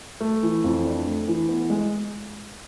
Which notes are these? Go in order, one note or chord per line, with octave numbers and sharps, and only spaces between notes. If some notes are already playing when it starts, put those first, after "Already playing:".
A3
E3
F2
D4
A3
E3
B3
G#3